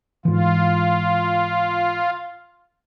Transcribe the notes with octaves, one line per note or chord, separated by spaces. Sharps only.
G#2 E3 F4